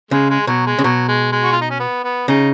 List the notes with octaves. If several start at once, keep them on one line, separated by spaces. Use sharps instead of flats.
C#3 G#3
G#3
B2 F#3
G#3
C#3
B2 F#3
G#3
G#3
F#4
F4
D#4
C#4
B3
B3
C#3 D#4